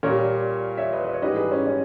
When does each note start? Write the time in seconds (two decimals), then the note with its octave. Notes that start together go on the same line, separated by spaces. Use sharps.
0.03 A#2 G3 A#4 C#5
0.77 C#5 E5
0.92 B4 D#5
1.05 B4
1.13 C#5
1.22 G#2 E3 G3 B4 D#5
1.36 G#4 B4
1.51 C#4
1.66 C#4